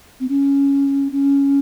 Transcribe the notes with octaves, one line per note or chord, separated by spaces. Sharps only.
C4
C#4
C#4